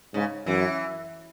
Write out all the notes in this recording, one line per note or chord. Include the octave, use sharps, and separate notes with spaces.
G#2 C#3
F#2 E3